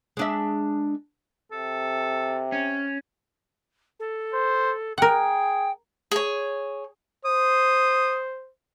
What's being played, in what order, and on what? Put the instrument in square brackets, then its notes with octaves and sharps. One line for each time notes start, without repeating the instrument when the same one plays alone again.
[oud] G#3 D4 E5
[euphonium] C3 [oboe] A4
[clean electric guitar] C#4
[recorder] A4
[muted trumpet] C5
[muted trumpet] G#4 [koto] A#4 F#5 [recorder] G5
[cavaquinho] G#4 C#5
[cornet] C5 [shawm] D#6